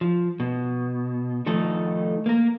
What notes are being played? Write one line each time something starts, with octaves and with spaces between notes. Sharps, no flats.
F3
B2
D#3 F3 A3 D#4 A4
A#3 A#4